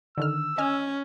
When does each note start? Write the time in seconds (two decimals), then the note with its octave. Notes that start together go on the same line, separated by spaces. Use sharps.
0.18 D3 D#3 E6 F6
0.58 C#4 D#5 G#5 F6